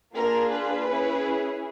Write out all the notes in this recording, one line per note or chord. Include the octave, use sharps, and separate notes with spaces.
A#3 D4 F4 G#4 A#4
B4
C#4 E4 G#4